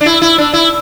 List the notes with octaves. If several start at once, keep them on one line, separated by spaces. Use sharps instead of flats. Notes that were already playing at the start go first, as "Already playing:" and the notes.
D4
E4
E4
D4
E4